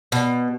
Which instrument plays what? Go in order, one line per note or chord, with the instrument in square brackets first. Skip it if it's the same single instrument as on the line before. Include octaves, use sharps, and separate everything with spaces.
[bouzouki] B2